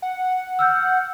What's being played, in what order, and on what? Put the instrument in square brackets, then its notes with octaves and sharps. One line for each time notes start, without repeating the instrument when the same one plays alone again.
[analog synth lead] F#5
[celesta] E6 F6 G6